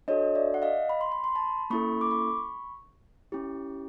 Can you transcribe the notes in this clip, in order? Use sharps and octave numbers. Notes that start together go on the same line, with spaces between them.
D4 F#4 A4 C#5 D#5
D5 E5
F#5
D#5 F5
B5
C6
B5
C6
A5 B5
A#3 C#4 E4 A4 B5 C#6
D6
B5 C#6
C#4 E4 G4